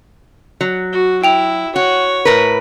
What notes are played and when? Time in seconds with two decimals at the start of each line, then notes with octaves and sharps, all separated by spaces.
0.61 F#3
0.93 F#4
1.24 E4 G5 F7
1.76 F#4 C#5
2.25 A2 A#4 B4